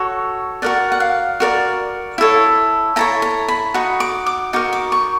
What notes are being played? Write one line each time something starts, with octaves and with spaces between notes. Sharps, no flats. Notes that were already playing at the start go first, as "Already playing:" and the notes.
Already playing: F#4 A4 C#5
F#4 A#4 D5 F#5
F#5
F5
F#4 A#4 D5
E4 A4 C#5
E4 A4 C#5 A#5
A#5
B5
D#4 F#4
D6
D6
D#4 F#4 A#4
D6
C#6